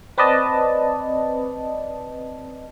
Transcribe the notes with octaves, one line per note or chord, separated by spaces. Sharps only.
C4 B4 D5 D#5 A5